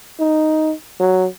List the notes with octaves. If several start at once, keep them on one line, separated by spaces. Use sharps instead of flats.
D#4
F#3